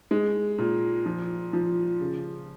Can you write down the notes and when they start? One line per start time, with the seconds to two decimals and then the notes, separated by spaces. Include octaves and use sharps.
0.11 G#3
0.58 A#2
1.06 F3
1.53 F3
2.01 C#3